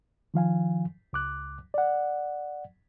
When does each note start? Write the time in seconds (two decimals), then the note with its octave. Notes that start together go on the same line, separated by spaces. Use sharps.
0.34 D#3 F3 F5 G#5
1.13 C#2 D6 F#6
1.74 D5 F#5